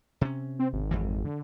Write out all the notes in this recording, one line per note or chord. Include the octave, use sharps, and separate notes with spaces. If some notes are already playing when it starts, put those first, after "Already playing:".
C3 C#4
C4
G#1
F2 G#2 E3
D3